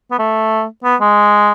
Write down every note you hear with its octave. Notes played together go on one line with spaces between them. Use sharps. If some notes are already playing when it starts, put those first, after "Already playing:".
B3
A3
B3
G#3